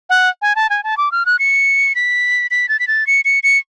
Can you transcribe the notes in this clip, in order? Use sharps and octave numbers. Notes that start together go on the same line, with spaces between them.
F#5
G#5
A5
G#5
A5
D6
F6
F#6
C#7
B6
B6
A6
B6
A6
C#7
C#7
C#7